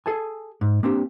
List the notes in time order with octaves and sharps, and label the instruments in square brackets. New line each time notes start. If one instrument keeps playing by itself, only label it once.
[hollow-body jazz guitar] G#4 A4 G#5 A5
G#2
A#3 C4 D4 G4